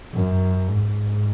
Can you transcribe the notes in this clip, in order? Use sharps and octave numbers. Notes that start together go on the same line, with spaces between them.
F#2
G#2